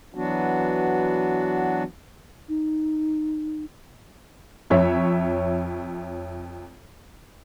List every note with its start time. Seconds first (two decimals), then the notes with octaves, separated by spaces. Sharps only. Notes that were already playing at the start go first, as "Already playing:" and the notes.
0.15 E3 F#3 B3 D4 F#4
2.49 D#4
4.70 F2 C#5 E5